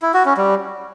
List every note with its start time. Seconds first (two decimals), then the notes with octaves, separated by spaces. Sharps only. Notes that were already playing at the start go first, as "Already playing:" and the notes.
0.02 E4
0.14 F#4
0.26 C#4
0.37 G3